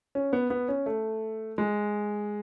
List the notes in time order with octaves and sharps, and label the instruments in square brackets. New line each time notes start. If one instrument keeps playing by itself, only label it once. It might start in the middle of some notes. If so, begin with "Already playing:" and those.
[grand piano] C#4
B3
B3
C#4
A3
G#3